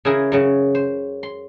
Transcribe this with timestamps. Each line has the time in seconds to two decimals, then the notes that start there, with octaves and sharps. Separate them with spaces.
0.05 C#3 E4 G#4 A#4
0.32 F#2 C#3 F#3
0.75 C5
1.23 C6